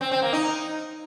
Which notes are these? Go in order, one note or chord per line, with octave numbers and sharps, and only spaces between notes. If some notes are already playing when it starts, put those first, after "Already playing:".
C4
C4
A#3
D#4